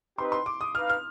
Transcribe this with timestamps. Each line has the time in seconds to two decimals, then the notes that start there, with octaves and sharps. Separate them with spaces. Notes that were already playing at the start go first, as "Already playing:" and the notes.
0.18 C4 D#4 G4 B4 C6
0.32 C6
0.46 D6
0.61 D#6
0.75 D#4 B4 F5 F6
0.89 F6